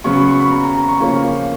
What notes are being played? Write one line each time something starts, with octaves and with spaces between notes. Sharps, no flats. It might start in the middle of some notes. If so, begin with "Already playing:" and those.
C#3 F#3 B3 C#6
B5
C#6
B5
A#5
A#5
A#5
C#6
C#3 F3 A#3 C#4 C#6